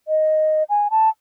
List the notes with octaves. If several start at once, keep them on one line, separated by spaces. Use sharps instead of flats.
D#5
G#5
A5